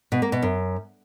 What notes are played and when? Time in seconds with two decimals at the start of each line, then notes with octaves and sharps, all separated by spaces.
0.12 B2
0.22 A#3
0.32 B2
0.42 F#2